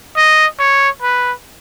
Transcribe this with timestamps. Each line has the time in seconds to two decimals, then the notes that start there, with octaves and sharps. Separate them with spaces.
0.16 D#5
0.59 C#5
1.02 B4